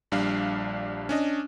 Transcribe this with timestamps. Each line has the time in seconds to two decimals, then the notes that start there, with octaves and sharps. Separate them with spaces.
0.12 A#1 G3 D4 F5
1.09 C#4 D4 D#5